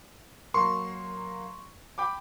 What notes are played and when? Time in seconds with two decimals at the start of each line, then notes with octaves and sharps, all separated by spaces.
0.54 F#3 A#3 C6 C#6
1.98 G5 B5 D6